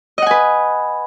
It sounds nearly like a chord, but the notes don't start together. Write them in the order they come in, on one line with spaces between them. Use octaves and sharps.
D#5 F#5 G#5 B4